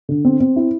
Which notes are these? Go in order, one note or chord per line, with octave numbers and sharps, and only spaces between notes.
D3
C4
C4
E4